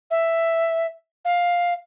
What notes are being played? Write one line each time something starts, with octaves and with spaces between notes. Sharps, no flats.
E5
F5